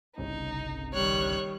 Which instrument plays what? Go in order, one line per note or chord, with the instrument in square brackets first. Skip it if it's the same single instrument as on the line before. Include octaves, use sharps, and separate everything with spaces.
[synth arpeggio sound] G1 C2 C#3 [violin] D#4
[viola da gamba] D#3 G3 [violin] C#5 F#6